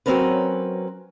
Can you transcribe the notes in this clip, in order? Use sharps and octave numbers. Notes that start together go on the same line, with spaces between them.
F#3 G3 C4 C#4 A#4 B4